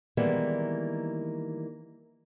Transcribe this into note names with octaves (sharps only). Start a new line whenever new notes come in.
D#3 E3 G3 G#3 A#3 B3